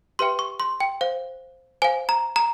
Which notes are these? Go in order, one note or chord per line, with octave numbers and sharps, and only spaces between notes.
G4 B4 E5 G5 C6
C#6
C6
G5
C5 F5
C5 F5 G#5
A#5
A#5